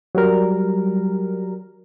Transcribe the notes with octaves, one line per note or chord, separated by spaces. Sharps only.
F#3 G3 A#4